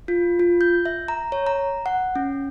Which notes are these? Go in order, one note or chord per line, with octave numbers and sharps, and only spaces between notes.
F4
F4
G6
E5
A#5
C#5
A#5
F#5
C#4